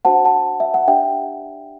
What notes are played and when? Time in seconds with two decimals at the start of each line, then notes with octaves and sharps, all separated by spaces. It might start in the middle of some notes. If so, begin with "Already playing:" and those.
0.05 D4 F#4 C5 F#5 A5
0.25 F#5 A5
0.60 E5
0.74 F#5
0.87 D4 G4 D5 E5 G5